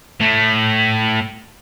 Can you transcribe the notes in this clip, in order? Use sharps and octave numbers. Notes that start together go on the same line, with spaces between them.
A2 A3